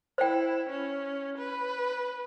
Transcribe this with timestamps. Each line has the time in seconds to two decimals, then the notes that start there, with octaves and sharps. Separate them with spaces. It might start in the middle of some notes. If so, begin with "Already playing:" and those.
0.18 E4 C5 G5
0.69 C#4
1.38 B4